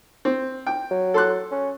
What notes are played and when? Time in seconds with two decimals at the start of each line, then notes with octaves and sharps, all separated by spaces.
0.25 C4
0.67 G5
0.91 F#3
1.14 A4 C6 F#6
1.51 C#4